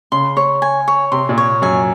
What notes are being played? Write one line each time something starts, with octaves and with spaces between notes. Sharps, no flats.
C#3 C6
C#5
G#5
C#5
C3 C6
A#2
C#5
F#2 G#5